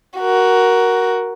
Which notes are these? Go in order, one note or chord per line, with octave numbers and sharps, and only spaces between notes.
F#4 A#4